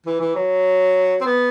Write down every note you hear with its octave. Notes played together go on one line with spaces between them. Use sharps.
E3
E3
F#3
C4
B3